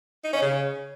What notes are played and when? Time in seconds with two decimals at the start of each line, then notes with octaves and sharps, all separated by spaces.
0.24 D#4
0.33 C#4
0.42 C#3